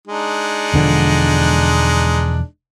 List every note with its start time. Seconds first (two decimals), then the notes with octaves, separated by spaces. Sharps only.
0.08 G#3 D4 D#4
0.74 E1 D3 F3